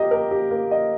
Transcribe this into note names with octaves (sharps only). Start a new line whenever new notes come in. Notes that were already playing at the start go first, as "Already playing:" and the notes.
Already playing: A#3 G4 A#4 D#5
A#4
G4
A#3
D#5